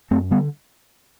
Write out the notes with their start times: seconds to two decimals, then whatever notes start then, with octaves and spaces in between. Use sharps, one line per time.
0.11 F#2 A3 C4
0.31 D3 G3 B3